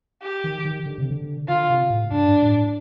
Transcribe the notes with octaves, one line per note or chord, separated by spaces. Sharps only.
G4
D#3
D#3
D3
C3
D3
D3 F4
C3
A2
G2 D4
A2